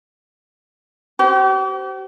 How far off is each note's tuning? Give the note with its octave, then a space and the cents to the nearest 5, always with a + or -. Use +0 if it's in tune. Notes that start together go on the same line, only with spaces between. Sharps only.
G4 -45 C5 -5